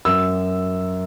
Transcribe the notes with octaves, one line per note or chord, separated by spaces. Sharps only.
F#2 E6